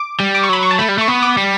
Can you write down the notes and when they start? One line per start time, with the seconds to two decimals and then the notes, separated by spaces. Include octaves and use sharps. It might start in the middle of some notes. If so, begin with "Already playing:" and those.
Already playing: D6
0.20 G3
0.35 D6
0.43 C#6
0.49 F#3 B5
0.63 C#6
0.71 A5
0.79 A3 B5
0.89 G3
0.98 A3 C#6
1.08 B3
1.23 D6
1.37 G3